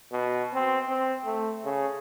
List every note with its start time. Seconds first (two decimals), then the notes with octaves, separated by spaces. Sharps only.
0.13 B2
0.54 C4
0.89 C4
1.25 A3
1.65 C#3